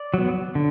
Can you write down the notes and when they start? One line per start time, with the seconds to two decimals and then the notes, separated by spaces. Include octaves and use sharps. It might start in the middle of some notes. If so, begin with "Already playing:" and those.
Already playing: D5
0.14 F#3 B3
0.55 D3